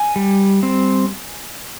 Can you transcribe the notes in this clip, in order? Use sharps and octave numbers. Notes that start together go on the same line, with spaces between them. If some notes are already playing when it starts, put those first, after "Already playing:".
Already playing: G#5
G3
C4